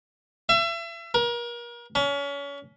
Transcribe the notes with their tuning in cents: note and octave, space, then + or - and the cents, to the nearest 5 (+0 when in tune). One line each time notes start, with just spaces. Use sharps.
E5 +35
A#4 +35
C#4 +30